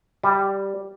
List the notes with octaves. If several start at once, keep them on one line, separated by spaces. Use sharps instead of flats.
G3